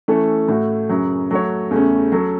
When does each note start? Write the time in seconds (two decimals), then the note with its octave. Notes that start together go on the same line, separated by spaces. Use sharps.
0.08 E3 A3 C#4 A4
0.48 A2 A3 F#4
0.89 F#2 C#3 F#3
1.31 F#3 A3 F#4 C#5
1.71 E2 C#3 A3 C#4
2.12 F#3 C#4 A4